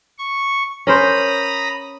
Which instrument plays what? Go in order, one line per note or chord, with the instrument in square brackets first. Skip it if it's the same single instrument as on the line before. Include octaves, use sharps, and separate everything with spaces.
[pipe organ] C#6
[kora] C#4 A#4 C5 [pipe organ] A#5 B5 D#6